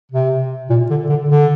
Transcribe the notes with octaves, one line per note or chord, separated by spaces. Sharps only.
C3
A#2
D3
D3
D3